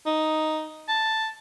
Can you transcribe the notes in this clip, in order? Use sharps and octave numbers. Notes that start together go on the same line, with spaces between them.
D#4
A5